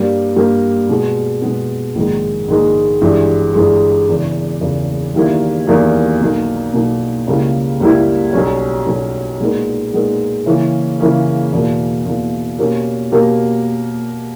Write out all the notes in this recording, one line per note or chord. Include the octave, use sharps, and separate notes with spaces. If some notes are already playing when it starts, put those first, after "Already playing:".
Already playing: G2 G3 A#3
G2 G3 A#3
B2 G#3 B3
B2 G#3 B3
A#1 G#2 D#3 G#3 D#4
A#1 G#2 D#3 G#3 D#4
G1 G2 E3 G#3
G1 G2 E3 G#3
E1 E2 C#3
E1 E2 C#3
E2 D#3 G3 A#3 E4
E2 D#3 G3 A#3 E4
B1 B2 A#3 D#4
B1 B2 A#3 D#4
C#2 C#3 G3 A#3 E4
C#2 C#3 G3 A#3 E4
B1 B2 G3 C#4
B1 B2 G3 C#4
A#2 G#3 B3 D#4 A#4
A#2 G#3 B3 D#4 A#4
C#3 E3 A#3 C#4
C#3 E3 A#3 C#4
E2 B2 A#3
E2 B2 A#3
B2 A#3 C#4 G4 A#4
B2 A#3 C#4 G4 A#4